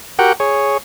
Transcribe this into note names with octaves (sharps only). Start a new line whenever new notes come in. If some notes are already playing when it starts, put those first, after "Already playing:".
F#4 G4 A#4 F#5 G5
G#4 C#5